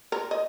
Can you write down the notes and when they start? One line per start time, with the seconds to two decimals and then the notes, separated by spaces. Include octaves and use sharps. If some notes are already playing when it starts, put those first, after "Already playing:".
0.12 A#4
0.31 D#5